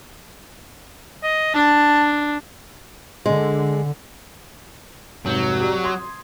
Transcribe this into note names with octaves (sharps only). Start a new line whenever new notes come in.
D#5
D4 A5
D3 G#3
F1 G#2 F#3 G6
G4 D5
C6 D#6 G#6